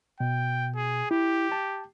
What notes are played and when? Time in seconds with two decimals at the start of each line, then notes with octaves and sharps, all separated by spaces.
0.20 B2 G5
0.76 G#4
1.11 E4 G4
1.52 A5